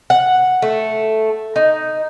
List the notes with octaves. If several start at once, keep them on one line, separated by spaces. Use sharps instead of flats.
F#5
A3
D#4